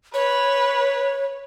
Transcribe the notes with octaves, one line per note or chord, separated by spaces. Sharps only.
B4 C#5